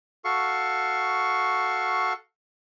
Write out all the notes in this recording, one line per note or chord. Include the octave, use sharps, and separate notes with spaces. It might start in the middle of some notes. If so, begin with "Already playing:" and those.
F#4 A4 F5 C#6